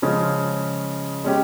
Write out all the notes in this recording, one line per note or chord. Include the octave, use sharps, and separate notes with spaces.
C#3 F3 G#3 C#4
G#3 C#4 G4